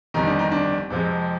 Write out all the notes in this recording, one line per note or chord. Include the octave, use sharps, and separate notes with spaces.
G1 F2 D#3 G3 D#4
D4
D#4
D4
F2 C3 F3 G#3